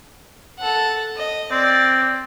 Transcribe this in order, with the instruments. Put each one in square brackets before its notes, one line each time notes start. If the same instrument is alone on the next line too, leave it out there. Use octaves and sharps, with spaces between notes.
[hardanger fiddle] A4 F#5
D#5
[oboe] C4 [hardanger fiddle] D5